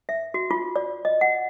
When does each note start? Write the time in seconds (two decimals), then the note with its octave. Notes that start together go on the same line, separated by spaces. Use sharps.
0.09 E5
0.34 F#4
0.51 F4
0.76 D5
1.05 D#5
1.21 F#5